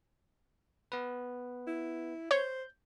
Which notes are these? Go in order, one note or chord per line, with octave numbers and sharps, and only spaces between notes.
B3 B4
E4
C5 C#5 G6